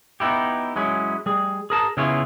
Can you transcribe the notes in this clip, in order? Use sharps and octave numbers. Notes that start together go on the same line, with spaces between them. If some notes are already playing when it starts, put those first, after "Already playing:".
B3 D#4 E4 G4
F#3 G#3 C#4 E4
G3 G#4
G#4 A#4 A5
C#3 B3 E4 F4 G#4 C#5